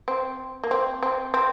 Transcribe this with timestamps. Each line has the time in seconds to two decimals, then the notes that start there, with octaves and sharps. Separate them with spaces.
0.08 C4
0.64 A#3
0.71 C4
1.03 C4
1.34 C4